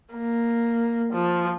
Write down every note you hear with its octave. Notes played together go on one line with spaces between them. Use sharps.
A#3
F3